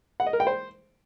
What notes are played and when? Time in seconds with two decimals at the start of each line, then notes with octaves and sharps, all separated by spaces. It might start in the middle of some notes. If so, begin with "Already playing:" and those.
0.20 F#5
0.26 D#5
0.33 A#4
0.40 G5
0.47 C5